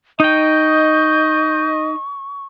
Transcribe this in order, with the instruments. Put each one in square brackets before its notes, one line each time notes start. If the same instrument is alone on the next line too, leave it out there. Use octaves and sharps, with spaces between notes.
[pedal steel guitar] D#4 G5 [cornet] D#5 [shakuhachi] C#6 [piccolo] G6